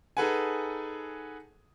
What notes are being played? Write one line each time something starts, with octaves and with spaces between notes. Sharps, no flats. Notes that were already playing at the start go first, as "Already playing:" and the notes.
D#4 G#4 A4 B4 F#5 G#5